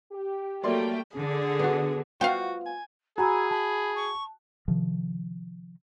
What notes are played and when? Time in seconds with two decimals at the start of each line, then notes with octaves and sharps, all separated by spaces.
0.12 G4
0.63 F#3 G3 A3 A#3 D5 G5 C6
1.17 D3 G#4
1.59 B3 F#4
2.21 B3 F4 F#4 F5 G5
2.66 G#5
3.18 F#4 G#4 G#5 A#5 B5 E6
3.50 A5 B5
3.95 C#6
4.68 C3 D#3 F3